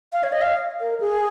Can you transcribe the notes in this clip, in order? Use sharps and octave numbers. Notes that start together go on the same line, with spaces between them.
F5
C#5
D#5
F5
A#4
G#4